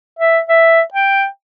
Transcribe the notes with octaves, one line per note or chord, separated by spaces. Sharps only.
E5
E5
G5